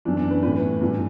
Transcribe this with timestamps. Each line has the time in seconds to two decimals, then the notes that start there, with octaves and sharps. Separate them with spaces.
0.05 F#2 E3 D4
0.17 D4
0.31 B4
0.43 A2 E3 B4
0.81 G2 E3